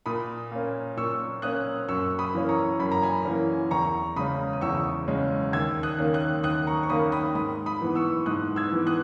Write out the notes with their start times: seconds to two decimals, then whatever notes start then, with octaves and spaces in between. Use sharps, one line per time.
0.06 A#2 B5 D#6
0.51 A#3 C#4
0.97 A#2 C#6 E6
1.42 A#3 C#4 D#6 F#6
1.89 F#2 C#6 E6
2.19 B5 D#6
2.34 E3 A#3 C#4
2.49 A#5 C#6
2.79 F#2 B5
2.92 A#5
3.03 G#5 B5
3.25 E3 A#3 C#4
3.71 E2 A#5 C#6
4.16 C#3 G#3 C#4 B5 D#6
4.53 D#6
4.61 E2 C#6 E6
5.08 C#3 G#3 C#4
5.52 D#2 E6 G#6
5.83 D#6 F#6
5.98 D#3 A#3 C#4
6.14 D#6 F#6
6.44 D#2 D#6 F#6
6.67 A#5 C#6
6.83 C#6
6.89 D#3 A#3 C#4 B5 D#6
7.12 B5 D#6
7.35 G#2 B5 D#6
7.66 B5 D#6
7.81 E3 B3
7.95 C#6 E6
8.26 G#2 D#6 F#6
8.56 E6 G#6
8.72 E3 B3
8.87 D#6 F#6